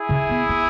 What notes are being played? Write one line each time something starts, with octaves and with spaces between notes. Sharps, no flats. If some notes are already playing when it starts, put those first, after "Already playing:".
Already playing: E4 G#4
C#3
B3
B3